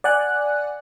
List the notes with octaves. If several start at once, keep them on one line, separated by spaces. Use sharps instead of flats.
D5 F#5 G#5 F#6